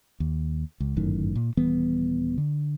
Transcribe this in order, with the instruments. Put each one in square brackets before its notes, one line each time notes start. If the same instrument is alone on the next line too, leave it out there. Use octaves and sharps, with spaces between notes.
[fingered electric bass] D#2
C#2
G1 F#2 A2 D#3
A#2
D#1 E3 G3 B3
D3